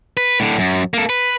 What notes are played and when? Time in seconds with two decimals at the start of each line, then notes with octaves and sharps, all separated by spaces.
0.17 B4
0.40 A2 D3
0.59 F#2
0.94 A#3 A4
1.10 B4